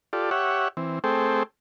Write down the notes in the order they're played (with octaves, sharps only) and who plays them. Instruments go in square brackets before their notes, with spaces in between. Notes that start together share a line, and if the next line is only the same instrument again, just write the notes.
[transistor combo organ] F4 G4 A4 D5
G4 C#5 E5 F#5
E3 C4
A3 C4 G#4 A4 C5 G5